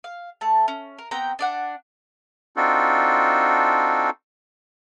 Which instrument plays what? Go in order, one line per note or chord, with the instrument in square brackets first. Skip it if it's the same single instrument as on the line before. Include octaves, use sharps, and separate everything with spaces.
[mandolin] F5
A3 A5
C#4
A#4
B3 C4 G5 A#5
D4 D5 F#5
[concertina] C4 D4 D#4 F4 F#4 A4